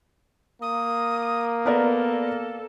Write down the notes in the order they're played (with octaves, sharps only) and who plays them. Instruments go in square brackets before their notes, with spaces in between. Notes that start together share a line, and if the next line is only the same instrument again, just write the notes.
[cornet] A#3 [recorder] D#6
[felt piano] B3 A#4 D5 [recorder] A4